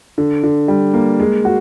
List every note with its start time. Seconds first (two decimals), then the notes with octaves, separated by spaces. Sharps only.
0.18 D3
0.43 D3
0.68 G3
0.94 A#3
1.20 G#3
1.45 F#4